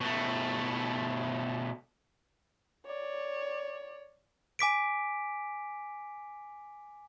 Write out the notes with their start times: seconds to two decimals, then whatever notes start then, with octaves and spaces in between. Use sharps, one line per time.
0.01 B2 A3
2.86 C#5 D5
4.59 G#5 D6 B6 D7